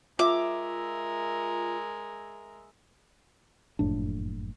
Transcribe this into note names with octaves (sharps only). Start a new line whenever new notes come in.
G#3 F4 A#4 E5 D6
F#1 F2 A2 D4